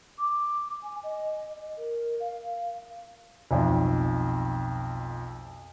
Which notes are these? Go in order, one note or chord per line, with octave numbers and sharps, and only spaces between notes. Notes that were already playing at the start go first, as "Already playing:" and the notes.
D6
G#5
D#5
A#4
F5
B1 F2